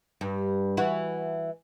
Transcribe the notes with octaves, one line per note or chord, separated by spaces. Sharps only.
G2
E3 F#4